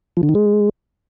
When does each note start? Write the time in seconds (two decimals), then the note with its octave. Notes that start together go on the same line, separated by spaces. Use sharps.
0.17 F3
0.23 D3
0.29 D#3
0.35 G#3